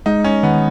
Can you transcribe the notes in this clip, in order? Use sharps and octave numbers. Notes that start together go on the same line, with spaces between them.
G#3 D#4
C#4
D#3 B3